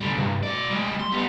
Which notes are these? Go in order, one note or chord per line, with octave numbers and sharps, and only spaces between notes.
D3 G3
C2 G2
B2 D5
G3 G#3
C6
G3 B3